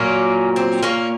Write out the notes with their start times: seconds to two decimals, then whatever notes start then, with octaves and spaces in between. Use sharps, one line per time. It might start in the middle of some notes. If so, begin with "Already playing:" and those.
Already playing: A#2 F#3 A#3 C#4
0.56 C4
0.83 A#3 C#4